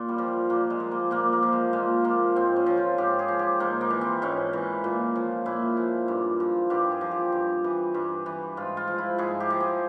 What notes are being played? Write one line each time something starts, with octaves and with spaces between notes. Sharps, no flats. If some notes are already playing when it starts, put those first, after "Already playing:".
Already playing: A#2 F4
G3
F3
A#2 A#3
G#3
F3
A#3
A#2 A#3
A#3
F3
G#3
A#2 G#3
F3 A#3
G#2 C4
C#4
F3
F4
G#2 G4
G#4
F3
G4
G#2 A#3
A#3
E3
C4
G#2 C#4
E3
A#2
F3
A#2 E4
F3
G2
F3
G2 G4
G#4
F3
G4
G2
E3
G2
E3
G#2 F4
F4
F3
E4
G#2 G#4
G4
F3
G#4